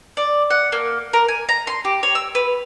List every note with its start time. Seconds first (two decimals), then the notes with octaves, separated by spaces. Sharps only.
0.17 D5
0.50 F#5
0.72 A#3
1.13 A#4
1.28 G#5
1.49 A#5
1.67 C6
1.85 G4
2.03 C#5
2.15 E6
2.35 B4